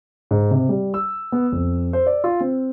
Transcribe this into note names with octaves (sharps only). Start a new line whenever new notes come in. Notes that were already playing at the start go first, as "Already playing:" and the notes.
G#2
C3
G3
E6
B3
F2
C5
D5
F4
C4